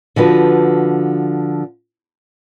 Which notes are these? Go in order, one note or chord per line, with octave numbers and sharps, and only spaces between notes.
D3 F3 F#4 B4